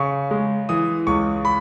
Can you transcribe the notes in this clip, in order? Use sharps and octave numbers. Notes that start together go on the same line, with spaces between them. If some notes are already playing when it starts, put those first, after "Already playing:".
Already playing: C#3 C#6
G#3
E3 D#6
C#2 C#6
B5